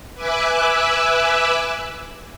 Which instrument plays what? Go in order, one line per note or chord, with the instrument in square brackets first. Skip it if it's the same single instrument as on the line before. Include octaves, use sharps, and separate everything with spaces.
[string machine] B4 E5 G#5 D6 E6 F#6